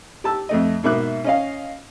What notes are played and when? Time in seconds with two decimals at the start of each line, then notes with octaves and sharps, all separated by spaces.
0.24 G4 A5 E6
0.49 F2 A3 D#5
0.83 G#2 B2 A#3 E5 D6 F#6
1.24 C#4 D#5 F5